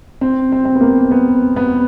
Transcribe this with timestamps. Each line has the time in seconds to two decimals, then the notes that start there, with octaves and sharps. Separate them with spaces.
0.21 C4
0.52 C4
0.65 C4
0.75 B3
0.81 A#3
1.11 B3
1.56 B3